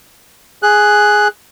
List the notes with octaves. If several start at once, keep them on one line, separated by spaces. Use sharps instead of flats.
G#4 F#6